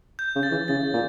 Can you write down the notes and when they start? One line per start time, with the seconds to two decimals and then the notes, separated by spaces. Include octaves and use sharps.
0.19 G6
0.35 C#3
0.43 A6
0.51 E3
0.68 C#3 A6
0.93 A#2